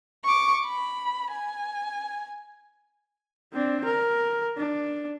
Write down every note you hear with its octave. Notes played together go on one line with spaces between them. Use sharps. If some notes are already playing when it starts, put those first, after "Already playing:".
C#6 D6
B5
G#5
C4 D4
A#4
D4